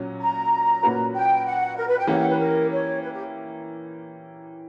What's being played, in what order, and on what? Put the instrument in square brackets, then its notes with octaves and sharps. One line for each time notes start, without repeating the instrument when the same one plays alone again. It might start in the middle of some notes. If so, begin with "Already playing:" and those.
Already playing: [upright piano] A#2 F#3 C#4
[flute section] A#5
[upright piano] A#2 A#3 C#4 F#4 B4
[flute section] G5
F#5
A#4
B4
G5
[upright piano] E3 A#3 C#4 G4 [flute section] F#5
[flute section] F#5
B4
A#4
C#5
B4
G4